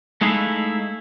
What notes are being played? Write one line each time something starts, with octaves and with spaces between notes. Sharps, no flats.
G#3 A3 D#4 E4 F5